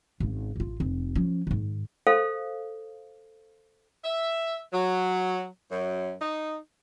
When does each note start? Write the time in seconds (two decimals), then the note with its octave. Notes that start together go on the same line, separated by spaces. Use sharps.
0.20 G#1 C#3
0.56 A1 F4
0.80 F1 C4
1.15 F3 C#4
1.47 G#2 D#3
2.07 A4 C5 F5
4.04 E5
4.73 F#3
5.70 F#2
6.20 D#4